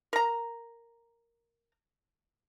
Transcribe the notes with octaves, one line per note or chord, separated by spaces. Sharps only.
A#4 A#5